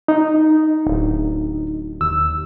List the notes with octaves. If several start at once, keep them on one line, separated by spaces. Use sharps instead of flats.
D#4
D1
D#2 E6